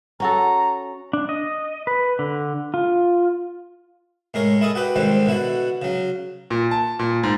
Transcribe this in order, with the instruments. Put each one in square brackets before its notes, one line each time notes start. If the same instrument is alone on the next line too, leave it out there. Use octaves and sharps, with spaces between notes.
[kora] C#4 F#4 A4 [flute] A#5
[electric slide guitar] D4
D#5
B4
D3
F4
[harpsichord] A2 G#3 A#4 C#5
E4 G#4 A4 D#5
F#4 G4 B4
G#2 D3 D#3 G3 C4
B2 D3 E4 F#4
C#3 F#3
[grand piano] A#2
A5
A#2
G#2